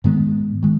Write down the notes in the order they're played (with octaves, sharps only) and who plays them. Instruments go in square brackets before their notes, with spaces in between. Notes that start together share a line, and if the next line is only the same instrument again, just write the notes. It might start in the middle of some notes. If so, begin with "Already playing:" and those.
[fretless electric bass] G#2 D#3 G#3 B3
D#3 G#3